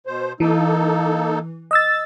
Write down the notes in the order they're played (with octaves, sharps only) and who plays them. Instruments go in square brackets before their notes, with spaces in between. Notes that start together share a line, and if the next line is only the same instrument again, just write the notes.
[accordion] B2 C5
[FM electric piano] E3 [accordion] A#3 D#4 A4
[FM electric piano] D#5 E6 A6